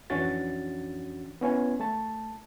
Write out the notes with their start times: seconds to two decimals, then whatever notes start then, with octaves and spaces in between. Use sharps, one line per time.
0.10 F2 E3 C#4 D4 F#4 A6
1.41 B3 C#4 E4 G#5
1.80 A3 A5